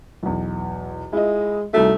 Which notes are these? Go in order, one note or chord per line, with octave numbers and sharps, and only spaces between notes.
B1 E2
G#3 E4 F4 D#5
C2 A3 D#4 F#4